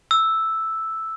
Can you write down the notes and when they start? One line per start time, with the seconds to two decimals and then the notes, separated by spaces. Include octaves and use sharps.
0.11 E6